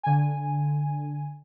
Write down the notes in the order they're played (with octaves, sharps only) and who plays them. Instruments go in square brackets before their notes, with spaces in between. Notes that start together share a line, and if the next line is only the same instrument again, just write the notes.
[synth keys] D3 G#5